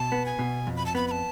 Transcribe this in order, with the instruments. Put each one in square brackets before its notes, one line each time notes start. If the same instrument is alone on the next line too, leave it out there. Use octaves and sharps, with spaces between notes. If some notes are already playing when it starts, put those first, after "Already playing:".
Already playing: [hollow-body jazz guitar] B2 [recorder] A5
[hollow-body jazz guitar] B3
[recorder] G#5
[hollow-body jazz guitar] B2
F2
[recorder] B5
A5
[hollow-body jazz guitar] B3 [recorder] B5
[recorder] B5
A5